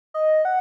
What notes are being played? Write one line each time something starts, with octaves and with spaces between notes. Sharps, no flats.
D#5
F#5